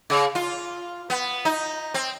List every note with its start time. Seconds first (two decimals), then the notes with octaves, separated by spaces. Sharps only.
0.10 C#3
0.35 F4
1.10 B3
1.45 D#4
1.94 C4